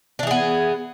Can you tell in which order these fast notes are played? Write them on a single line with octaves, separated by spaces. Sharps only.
D4 E3 G#4 B3